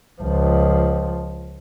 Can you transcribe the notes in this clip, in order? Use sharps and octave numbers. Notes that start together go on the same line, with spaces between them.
C#2 F3